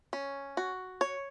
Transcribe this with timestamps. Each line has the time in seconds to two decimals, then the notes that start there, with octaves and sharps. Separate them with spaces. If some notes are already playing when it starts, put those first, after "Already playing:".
0.13 C#4
0.57 F#4
1.01 C#5